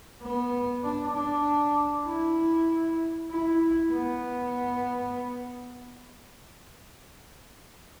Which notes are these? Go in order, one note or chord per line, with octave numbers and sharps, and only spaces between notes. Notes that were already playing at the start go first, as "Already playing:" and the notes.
B3
D4
D4
E4
E4
B3